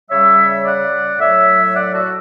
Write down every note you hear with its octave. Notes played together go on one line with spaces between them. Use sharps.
C#3 G3 C#5 E5
D5 F#5
A2 F#3 C#5 E5
D5 F#5
F#4 A4